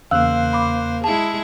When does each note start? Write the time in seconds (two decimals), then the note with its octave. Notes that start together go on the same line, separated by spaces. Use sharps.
0.11 E2 C#3 A#3 C5 F5 E6 F#6
0.53 B5 D6
1.04 G#3 E4 G#4 A5